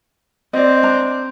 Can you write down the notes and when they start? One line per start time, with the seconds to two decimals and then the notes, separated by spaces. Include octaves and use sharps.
0.53 C4 D5 D#5
0.83 D4 A#5